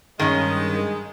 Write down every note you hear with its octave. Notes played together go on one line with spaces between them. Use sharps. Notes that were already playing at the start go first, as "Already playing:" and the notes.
G2 D#3 G#3 C#4